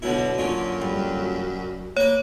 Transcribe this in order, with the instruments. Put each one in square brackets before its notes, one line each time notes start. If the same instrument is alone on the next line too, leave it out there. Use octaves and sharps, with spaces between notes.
[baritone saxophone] B2 [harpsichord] D3 F#3 E4
[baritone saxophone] F#2 [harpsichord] A#2 D3 C#4
[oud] G3
[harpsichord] A#3 B4 [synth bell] C#5